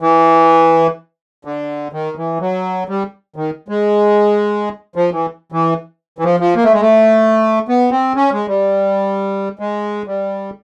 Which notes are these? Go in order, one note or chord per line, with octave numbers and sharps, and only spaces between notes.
E3
D3
D#3
E3
F#3
G3
D#3
G#3
F3
E3
E3
E3
F3
F3
A#3
A3
G#3
A3
B3
C4
C#4
G#3
G3
G#3
G3